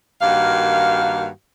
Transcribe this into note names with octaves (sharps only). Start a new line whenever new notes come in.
G2 D#3 A#3 F#4 F5